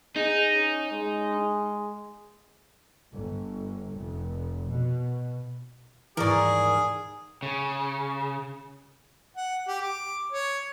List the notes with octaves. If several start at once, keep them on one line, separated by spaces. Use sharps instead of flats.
D#4 G#4
C#4
G#3
G1
F1
B2
D#2 G#2 E3 G#4 A#4 D5 A#5 C#6
C#3
F#5
G4
D6
C#5